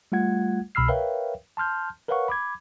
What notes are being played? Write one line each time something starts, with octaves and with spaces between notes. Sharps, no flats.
G3 A3 F4 F#5 G#6
C2 B2 B5 E6 F6 C7
A#4 B4 C#5 E5 F5 G5
A5 C6 F6 G6
A#4 B4 C#5 F5 F#5 C#6
B5 D6 G#6